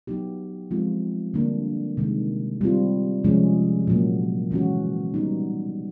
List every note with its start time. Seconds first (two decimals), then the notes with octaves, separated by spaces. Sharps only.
0.07 F#3 B3 D#4 G4
0.71 F3 G#3 C4 F4
1.34 D3 G3 A#3 D4
1.97 C3 D#3 G#3
2.61 G3 C4 F4
3.24 C3 F3 G#3 C#4
3.87 A#2 F#3 A#3
4.51 C#3 E3 G#3 C#4 F#4
5.14 G3 B3 D#4